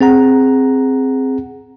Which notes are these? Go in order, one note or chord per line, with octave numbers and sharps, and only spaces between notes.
C4 G#4 F#5 A#5